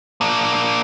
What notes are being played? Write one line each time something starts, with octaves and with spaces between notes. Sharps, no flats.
A#3 D4